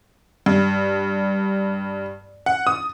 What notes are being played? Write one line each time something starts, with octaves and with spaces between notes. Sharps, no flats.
G2
F#5
D#6